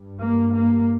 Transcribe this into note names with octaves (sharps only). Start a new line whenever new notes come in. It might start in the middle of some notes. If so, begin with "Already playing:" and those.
Already playing: G2
A#3
A#3